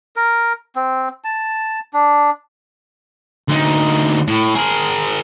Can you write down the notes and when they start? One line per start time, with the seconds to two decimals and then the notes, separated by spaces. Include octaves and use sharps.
0.16 A#4
0.76 C4
1.24 A5
1.93 D4
3.48 D2 D#4
4.28 A2
4.55 G#4 A#4